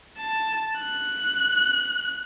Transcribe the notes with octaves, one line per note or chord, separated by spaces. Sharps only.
A5
F#6